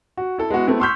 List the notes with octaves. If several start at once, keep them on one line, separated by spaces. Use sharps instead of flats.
F#4
E4 A4
G#3 B3 E4 F#4
A3 B3 C4 E4
C6 C#6 E6 F6 G6 B6